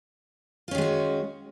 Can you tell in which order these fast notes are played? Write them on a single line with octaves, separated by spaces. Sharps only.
F4 C#4 D#3 G#3 F#4